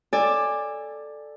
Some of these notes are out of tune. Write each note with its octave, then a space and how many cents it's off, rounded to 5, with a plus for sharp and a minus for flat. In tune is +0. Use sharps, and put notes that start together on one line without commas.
A4 +0 D5 +10 G#5 -20